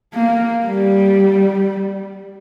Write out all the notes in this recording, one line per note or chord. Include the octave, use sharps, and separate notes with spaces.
A#3
G3